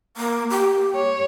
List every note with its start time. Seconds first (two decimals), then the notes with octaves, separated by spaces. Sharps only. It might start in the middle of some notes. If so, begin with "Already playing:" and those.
0.17 A#3
0.50 G4
0.95 C#5